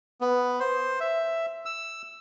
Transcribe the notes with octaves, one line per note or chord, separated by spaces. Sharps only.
B3
C5
E5
E6